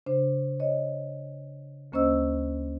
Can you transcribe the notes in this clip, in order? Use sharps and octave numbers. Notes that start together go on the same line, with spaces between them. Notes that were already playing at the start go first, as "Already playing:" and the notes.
C#3 D4 C5
C#5 D#5
D2 A#3 C#4 C5 D#5 E6